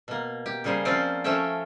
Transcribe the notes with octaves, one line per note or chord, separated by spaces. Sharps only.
B2 A#3
G4
C#3 G3 A#3 G#4 C5
F3 C4 C#4 F4 C5 D5
F3 A3 C#4 C#5 E5 G5